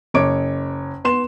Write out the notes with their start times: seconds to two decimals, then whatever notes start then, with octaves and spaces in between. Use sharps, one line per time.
0.14 F#1 C#5 D6 D7
1.04 B3 C6 E7